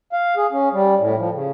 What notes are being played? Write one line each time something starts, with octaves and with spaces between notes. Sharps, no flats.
F5
G#4
C#4
G3
A2
F3
C#3